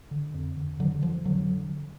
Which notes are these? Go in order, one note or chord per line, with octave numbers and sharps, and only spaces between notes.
D3
F2
D3
F2 D3 F#3
D3 F3
F2 D3 F#3
D3